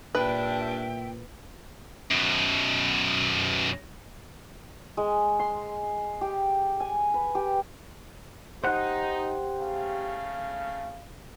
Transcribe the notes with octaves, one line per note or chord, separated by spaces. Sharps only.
G2 A#2 D4 B4 E5 G5
F#2 B2
G#3
C6
G4
G#5
B4
G4
D#4 G4 C5 F#5
C#3 A3 F5